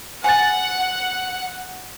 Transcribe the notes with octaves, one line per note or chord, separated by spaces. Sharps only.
F#5 G#5 A6